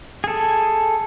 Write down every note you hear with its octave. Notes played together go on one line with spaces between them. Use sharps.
G#4 A4